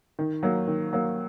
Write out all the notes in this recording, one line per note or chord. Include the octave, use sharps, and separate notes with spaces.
D#3
F#3 A#3
D#3
F#3 A#3